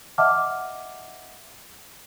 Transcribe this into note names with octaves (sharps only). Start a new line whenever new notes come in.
D#5 E5 F#5 A5 D6 F6